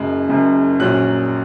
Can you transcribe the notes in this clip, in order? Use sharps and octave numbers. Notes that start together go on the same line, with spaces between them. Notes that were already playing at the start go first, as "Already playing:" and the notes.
Already playing: F#1 F#2 C#3 G#3
F#1 F#2 C#3 G#3
A#1 A#2 F#3 C#4 F#6